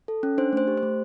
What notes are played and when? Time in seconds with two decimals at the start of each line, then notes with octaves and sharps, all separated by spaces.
0.08 A4
0.23 C#4
0.38 D4 C5
0.53 A3 C5
0.68 G4
0.77 C5
0.83 A3